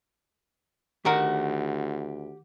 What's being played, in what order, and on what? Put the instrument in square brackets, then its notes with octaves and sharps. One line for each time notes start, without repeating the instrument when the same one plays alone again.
[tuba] D2 [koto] D#3 D#4 A#4 [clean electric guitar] G4 F#5